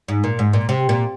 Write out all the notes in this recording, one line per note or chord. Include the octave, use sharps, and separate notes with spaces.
G#2
A#2
G#2
A#2
C3
A#2